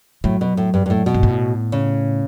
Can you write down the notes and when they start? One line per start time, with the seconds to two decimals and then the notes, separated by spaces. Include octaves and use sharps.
0.24 A2 F#3
0.41 B2
0.57 A2
0.74 G2
0.86 G2
0.90 A2
1.06 B2
1.14 G2
1.23 A2
1.72 C#3